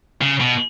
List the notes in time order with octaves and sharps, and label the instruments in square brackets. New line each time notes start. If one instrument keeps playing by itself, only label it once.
[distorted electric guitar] C#3
B2